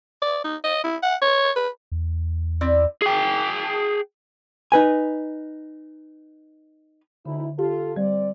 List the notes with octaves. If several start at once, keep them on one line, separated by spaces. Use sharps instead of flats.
D5
D#4
D#5
E4
F#5
C#5
B4
E2
C4 E4 D5
G#4 G5
D#4 B4 G#5
D2 D3 D#4 E4
F4 G4 A4
G3 C4 D5